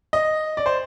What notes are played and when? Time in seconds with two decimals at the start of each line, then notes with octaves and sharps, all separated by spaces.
0.13 D#5
0.57 D5
0.66 C5